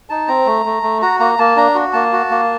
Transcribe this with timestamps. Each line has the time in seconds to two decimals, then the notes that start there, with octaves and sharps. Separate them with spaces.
0.10 D#4 A5
0.28 C4 A#5
0.46 A3
0.66 A3
0.83 A3
1.02 F#4 A#5
1.20 A#3 A#5
1.39 A#3 A5
1.56 D4 A#5
1.75 F#4
1.93 A#3 A5
2.12 F#4
2.31 A#3